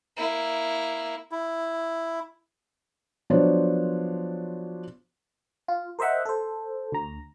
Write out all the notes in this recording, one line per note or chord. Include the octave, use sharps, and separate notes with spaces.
A#3 E4
E4
F3 F#3 B3 D4 C5 C#5
F4
A#4 C5 D#5 E5 F#5
A4 C5
D2 A#5